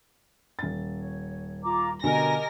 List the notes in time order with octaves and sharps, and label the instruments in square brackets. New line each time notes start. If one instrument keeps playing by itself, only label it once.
[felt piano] D#1 A6
[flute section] C#5
F4 A#5 D6
[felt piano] B2 D3 [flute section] G4 D#5 G#5 [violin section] A#4 A#6